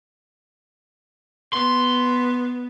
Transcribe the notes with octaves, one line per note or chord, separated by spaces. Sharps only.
B3 C6